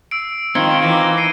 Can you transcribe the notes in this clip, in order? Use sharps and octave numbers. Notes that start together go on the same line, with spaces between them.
E6 C7 D7
D#3 C4 D#4 F4 G#6 C#7 G7
E3 A#3 A#6 G7
C7 C#7 D#7